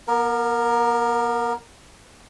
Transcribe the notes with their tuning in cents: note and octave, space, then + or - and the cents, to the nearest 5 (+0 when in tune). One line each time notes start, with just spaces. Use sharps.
B3 -45 A#4 +0